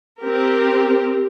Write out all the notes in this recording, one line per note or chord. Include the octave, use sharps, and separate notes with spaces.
C4 G4 A#4